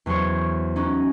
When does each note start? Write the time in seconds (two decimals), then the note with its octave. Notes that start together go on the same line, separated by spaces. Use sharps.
0.06 E2 F#3 B3 C5 C#5
0.76 C#4 D#4 F#4